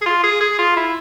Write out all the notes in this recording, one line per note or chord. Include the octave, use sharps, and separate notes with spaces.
G#4
F4
G#4
G#4
F4
E4